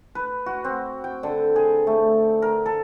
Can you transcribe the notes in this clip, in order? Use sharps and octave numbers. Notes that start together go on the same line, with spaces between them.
B4
F#4
C4
G5
D3
G#4
A3
A#4
A4